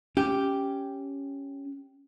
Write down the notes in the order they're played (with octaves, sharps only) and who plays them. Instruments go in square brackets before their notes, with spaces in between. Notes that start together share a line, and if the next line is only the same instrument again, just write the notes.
[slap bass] C#4 [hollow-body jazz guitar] G4